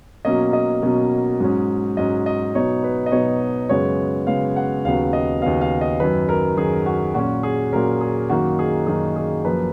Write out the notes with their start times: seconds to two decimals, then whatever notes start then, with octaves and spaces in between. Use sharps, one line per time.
0.25 B2 F#3 A#3 C#4 D#5
0.53 D#5
0.82 B2 F#3 A#3 C#4
1.40 G#2 F#3 C#4
1.97 G#2 F#3 C#4 D#5
2.26 D#5
2.55 B2 F#3 B3 D#4 C#5
2.84 B4
3.06 D#5
3.12 B2 F#3 B3 D#4 C#5
3.69 F#2 C#3 G#3 B3 C#5
4.27 F#2 C#3 G#3 B3 F5
4.56 F#5
4.85 D#2 C#3 F#3 B3 F5
5.13 D#5
5.42 D#2 C#3 F#3 B3 F5
5.61 F5
5.81 D#5
6.00 F#2 D#3 F#3 B4
6.29 A#4
6.57 F#2 D#3 F#3 G#4
6.86 F#4
7.15 A#2 F#3 C#4 F#4
7.43 G#4
7.72 A#2 F#3 C#4 A#4
8.01 G#4
8.29 F#2 D#3 A#3 D#4 F#4
8.59 G#4
8.87 F#2 D#3 A#3 D#4 G#4
9.16 G#4
9.44 F#2 F3 A#3 B4